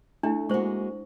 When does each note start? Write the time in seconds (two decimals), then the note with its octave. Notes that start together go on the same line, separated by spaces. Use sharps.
0.23 A3 D4 E4 E5
0.49 G#3 A#3 F#4 C5 C#6